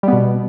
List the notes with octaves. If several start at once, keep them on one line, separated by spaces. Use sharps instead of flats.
B2 G3 B3